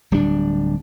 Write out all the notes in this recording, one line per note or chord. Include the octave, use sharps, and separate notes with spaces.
D1 G3 A3 D4